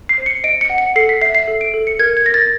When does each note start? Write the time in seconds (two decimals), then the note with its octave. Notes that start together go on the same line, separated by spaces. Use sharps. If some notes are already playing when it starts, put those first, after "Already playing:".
0.09 C7
0.18 C5
0.26 C#7
0.44 D#5 D7
0.61 C#7
0.70 F#5
0.78 C#7
0.96 A4 C7
1.09 B6
1.21 E5 C7
1.35 C7
1.48 A4
1.61 D7
1.74 A4
1.87 C#7
1.99 A#4 G#6
2.17 G#6
2.26 A#4 A#6
2.34 A6